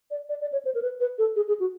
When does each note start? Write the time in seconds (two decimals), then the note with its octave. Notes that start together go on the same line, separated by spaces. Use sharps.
0.11 D5
0.29 D5
0.41 D5
0.52 C#5
0.65 C5
0.75 A#4
0.82 B4
1.00 B4
1.18 A4
1.36 G#4
1.48 G#4
1.60 F#4